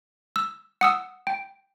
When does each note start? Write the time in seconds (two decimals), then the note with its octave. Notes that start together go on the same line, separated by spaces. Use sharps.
0.36 E6
0.81 F#5 D#6 E6
1.27 G5